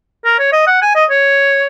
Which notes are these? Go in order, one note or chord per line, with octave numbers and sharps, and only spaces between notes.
A#4
C#5
D#5
F#5
G#5
D#5
C#5